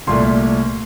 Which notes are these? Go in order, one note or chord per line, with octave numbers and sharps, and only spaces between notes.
C2 A#2 A3 C6